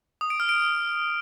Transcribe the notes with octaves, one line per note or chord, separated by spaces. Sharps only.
D#6
D7
F6
D7